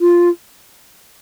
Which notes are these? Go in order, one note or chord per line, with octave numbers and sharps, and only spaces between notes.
F4